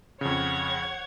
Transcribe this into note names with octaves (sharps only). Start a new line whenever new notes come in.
F2 C#3 C#5 F#5 G#6